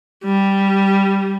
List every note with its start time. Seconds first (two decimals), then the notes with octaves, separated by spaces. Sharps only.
0.24 G3